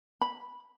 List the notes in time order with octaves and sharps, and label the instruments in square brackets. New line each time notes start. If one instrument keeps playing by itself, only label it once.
[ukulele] B5